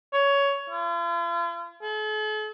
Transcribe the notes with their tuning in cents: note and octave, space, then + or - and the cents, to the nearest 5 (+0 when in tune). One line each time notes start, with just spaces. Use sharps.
C#5 +15
F4 -45
A4 -45